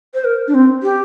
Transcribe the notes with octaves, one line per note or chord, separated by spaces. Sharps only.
C5
A#4
D4
C4
G4